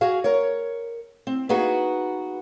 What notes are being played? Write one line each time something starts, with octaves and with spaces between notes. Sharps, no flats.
F#4 G#4 F5
A#4 C#5
C4
A#3 B3 D#4 F#4 G#4 B4